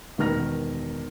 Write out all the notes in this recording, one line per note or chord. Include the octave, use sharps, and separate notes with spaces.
E1 D#3 B4 F6 A#6